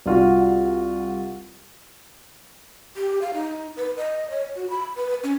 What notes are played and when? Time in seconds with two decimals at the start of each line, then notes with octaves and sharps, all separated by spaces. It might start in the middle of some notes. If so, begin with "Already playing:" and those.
0.06 C2 F4 F#4
2.96 G4
3.22 F5
3.34 D#4
3.77 B4
3.97 D#5
4.30 C#5
4.56 F#4
4.70 B5
4.96 B4
5.24 C#4